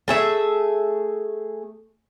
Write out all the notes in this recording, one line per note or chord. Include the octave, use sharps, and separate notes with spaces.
A3 G#4 E5